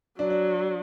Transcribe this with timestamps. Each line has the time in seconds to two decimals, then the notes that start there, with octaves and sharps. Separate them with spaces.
0.19 F#3 D4
0.30 D4